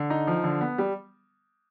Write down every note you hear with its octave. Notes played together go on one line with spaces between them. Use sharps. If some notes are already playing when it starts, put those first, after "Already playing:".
Already playing: D3
D#4
F3
D3
B3
G3